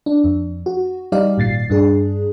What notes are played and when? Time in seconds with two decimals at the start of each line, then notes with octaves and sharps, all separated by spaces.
0.06 D4
0.24 F2
0.66 F#4
1.12 G3 D#4 G4 D5 F5
1.38 G#1 A#2 A6 C7
1.70 G2 D4 G#4